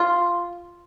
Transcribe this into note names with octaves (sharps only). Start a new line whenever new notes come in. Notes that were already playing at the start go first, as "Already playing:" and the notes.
Already playing: F4